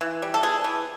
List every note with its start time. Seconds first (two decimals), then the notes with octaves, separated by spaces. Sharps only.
0.01 E3
0.22 G3
0.34 A4
0.43 B3 G#4
0.64 E3